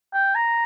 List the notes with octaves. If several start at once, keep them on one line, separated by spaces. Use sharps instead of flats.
G5
A#5